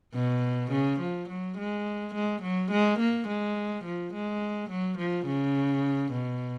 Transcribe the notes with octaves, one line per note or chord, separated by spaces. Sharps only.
B2
C#3
F3
F#3
G#3
G#3
F#3
G#3
A#3
G#3
F3
G#3
F#3
F3
C#3
B2